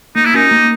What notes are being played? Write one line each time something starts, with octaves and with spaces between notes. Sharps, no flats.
A#3 D#4
E4
C#4 D#4 F#4 A#4
A#3